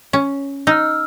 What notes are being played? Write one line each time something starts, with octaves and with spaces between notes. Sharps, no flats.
C#4
D#4 E6 F6